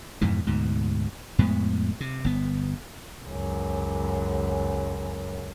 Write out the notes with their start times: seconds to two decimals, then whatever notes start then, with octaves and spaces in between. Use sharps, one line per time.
0.21 F2 G#2 B2 E3
0.47 D2 G#2 B2
1.38 F2 A2 G#3 B3
2.00 C3
2.24 G1 B3
3.25 C#2 F#2